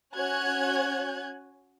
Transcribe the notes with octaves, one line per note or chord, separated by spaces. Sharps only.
C#4 F#4 C#5 G#5 F#6 G#6